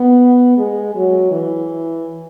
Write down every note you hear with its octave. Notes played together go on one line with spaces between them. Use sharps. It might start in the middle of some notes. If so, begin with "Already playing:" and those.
Already playing: B3
G#3
F#3
E3